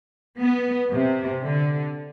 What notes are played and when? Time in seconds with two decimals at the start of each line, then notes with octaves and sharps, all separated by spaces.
0.41 B3
0.92 C3
1.45 D3